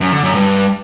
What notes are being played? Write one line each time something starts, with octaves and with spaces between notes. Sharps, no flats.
F#2
D3
F#2
G2